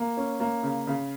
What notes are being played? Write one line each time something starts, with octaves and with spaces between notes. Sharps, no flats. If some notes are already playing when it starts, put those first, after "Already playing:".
Already playing: A#3
C#4
A#3
C#3
C#3